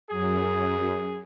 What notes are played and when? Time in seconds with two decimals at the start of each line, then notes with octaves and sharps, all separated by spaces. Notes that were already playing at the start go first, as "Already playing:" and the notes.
0.10 F#2 G#4